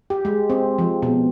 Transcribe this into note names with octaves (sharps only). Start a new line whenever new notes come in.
G4
G#3
C4
F3
B2